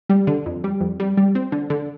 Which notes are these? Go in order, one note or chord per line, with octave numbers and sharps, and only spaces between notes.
G3
D3
F2
G3
F2
G3
G3
C4
D3
D3